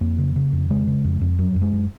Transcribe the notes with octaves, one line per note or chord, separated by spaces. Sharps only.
F2 A#3
C#3
C#3
F2
C#3 G#3
C#3
F2
F2
F#2 F#3
F#2
G#3
F#2